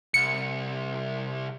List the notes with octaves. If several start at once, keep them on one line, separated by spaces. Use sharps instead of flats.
C2 C#7